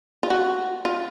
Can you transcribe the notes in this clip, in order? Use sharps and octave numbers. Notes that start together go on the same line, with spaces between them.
F4
F#4
F4